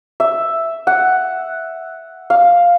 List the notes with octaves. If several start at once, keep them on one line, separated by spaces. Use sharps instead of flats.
E5
F#5
F5